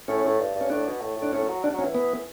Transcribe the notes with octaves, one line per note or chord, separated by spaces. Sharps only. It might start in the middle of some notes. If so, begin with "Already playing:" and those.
A2 C#4
A2
G2
G2
C#4
A2 D4
B2
A2
A2
D4
A2 C#4
F#3
G3 D4
F#3
C#4
E3
B3